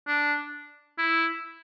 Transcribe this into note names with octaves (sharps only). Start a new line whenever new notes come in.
D4
E4